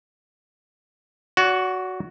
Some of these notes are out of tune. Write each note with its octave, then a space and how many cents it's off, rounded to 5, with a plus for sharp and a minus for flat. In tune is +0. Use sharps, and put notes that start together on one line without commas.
F#4 +0 D5 -45